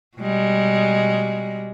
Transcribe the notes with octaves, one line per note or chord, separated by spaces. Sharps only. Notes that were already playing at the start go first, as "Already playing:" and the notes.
B2 G3 G#3